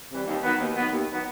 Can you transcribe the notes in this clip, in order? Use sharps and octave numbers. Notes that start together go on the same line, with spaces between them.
C3 E3 G3
D#2
D#3 F#3 B3
D#2
D#3 F#3 B3
D#2
D#3 F#3 B3